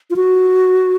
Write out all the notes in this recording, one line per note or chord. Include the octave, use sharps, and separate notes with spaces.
F4
F#4